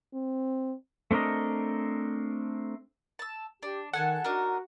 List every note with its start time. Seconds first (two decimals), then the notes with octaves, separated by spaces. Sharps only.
0.13 C4
1.11 A3 C4 D4 A#4 D#5
3.19 A5 E6
3.63 D4 G4
3.93 D#3 A4 F#5 G#5 A5
4.24 D4 D#4 F#4 A#4